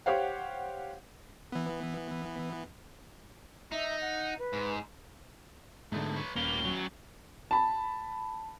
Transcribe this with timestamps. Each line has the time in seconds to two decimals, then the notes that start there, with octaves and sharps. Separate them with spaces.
0.06 G4 C5 C#5 F5 F#5
1.52 E3 B3
3.72 D#4 E5
4.01 F#5
4.39 B4
4.53 G#2
5.92 G#2 D3 A3 B3
6.16 B4 C#5
6.36 D#1 A#3 C#4 B4 G7
6.65 F#3
7.51 A5 B5